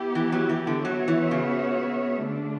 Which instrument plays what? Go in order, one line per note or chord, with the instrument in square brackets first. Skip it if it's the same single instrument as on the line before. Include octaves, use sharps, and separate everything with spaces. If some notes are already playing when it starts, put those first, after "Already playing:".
Already playing: [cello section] B3 E4 G4
[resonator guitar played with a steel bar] E3
F#3
E3
D3
[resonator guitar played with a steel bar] F#3 [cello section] B3 F#4 C#5 E5
[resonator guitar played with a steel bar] E3
C#3
[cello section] D3 A3 D4